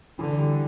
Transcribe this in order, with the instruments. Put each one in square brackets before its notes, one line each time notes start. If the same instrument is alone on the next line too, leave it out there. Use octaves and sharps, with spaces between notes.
[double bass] D3 [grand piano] E3
[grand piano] G3